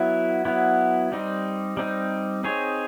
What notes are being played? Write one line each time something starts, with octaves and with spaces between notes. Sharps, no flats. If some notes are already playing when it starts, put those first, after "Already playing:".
Already playing: F#3 B3 E4
F#3 B3 E4
G3 C4 D#4
G3 C4 D#4
C4 D#4 G#4 C#5